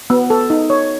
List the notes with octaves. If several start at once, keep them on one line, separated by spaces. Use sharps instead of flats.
B3
A4
D#4
C#5